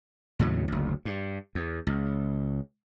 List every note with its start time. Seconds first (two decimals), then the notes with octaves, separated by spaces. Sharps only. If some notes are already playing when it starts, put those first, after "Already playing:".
0.39 D#2 A2 C#3 F#3
0.68 F#1 D2
1.05 G2
1.55 E2
1.87 C#2